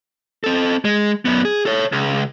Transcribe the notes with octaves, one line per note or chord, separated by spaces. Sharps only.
C4 A4
G#3
F#2 B3
G#4
A4 C#5
C#2